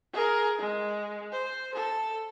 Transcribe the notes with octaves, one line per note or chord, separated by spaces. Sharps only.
G#4 A#4
G#3
C5
A4